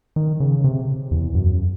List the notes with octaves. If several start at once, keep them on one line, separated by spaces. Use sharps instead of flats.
D#3
C#3
C3
E2
F#2